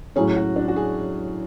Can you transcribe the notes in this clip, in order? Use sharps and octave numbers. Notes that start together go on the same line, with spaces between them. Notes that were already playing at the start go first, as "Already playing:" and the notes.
A2 F#3 C#4 G#4
F#4
D4
F#4
G#4